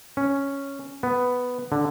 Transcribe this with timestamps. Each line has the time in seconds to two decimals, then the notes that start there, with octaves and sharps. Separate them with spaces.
0.17 C#4
1.03 B3
1.72 D3